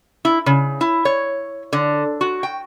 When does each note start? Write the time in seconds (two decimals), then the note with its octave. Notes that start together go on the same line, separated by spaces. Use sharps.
0.25 E4
0.46 C#3
0.81 E4
1.05 C#5
1.73 D3
2.21 F#4
2.43 G5